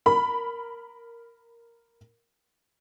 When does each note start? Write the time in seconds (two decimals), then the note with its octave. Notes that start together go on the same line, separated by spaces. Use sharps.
0.06 A#4 B5